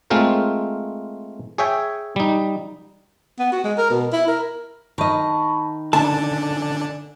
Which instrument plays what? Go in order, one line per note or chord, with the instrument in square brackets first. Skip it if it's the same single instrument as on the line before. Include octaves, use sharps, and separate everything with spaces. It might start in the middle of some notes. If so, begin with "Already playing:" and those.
[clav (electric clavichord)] G#3 A3 C4 F4 A#4 C5
G#4 C#5 E5 G5 G#5
G3 D#4
[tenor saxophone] B3
F#4
G#3
A#4
B2
E4
A#4
[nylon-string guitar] D#3 D#5 [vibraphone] A5 B5 C#6
[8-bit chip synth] D3 D4 [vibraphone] G#5 [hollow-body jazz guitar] A5